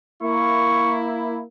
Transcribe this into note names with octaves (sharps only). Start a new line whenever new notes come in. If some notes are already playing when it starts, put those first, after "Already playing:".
A#3 E4 C#6